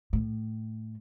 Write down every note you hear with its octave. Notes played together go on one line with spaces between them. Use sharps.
A2